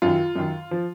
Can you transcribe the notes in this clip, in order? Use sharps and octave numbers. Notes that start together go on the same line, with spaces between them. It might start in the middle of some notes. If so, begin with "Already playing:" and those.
F#2 D#3 F4
F#2 D#3
F3